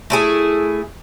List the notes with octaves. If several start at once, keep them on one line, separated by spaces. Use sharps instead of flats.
A3 E4 G#4